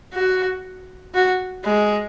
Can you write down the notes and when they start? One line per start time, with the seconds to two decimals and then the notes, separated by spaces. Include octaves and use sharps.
0.13 F#4
1.14 F#4
1.65 G#3